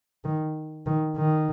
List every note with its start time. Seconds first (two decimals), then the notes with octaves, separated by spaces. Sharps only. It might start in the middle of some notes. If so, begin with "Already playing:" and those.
0.24 D#3
0.86 D#3
1.17 D#3